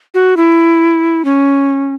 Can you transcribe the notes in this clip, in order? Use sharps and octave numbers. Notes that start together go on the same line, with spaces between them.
F#4
E4
C#4